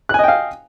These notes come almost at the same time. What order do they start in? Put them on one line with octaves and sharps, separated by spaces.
F#6 G#5 D#5 G5 F5